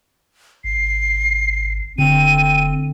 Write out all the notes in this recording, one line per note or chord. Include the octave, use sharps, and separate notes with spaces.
G#1 C7
F1 D3 C4 D#7